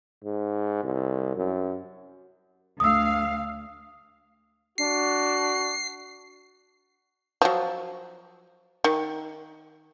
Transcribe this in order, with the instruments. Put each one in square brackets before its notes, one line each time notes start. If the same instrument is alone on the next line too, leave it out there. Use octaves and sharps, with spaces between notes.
[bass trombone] G#2
C2
F#2
[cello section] D2 F5 [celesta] D#6 E6
[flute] D4 [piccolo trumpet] F#4 [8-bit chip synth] C7
[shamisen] F3 F#3
D#3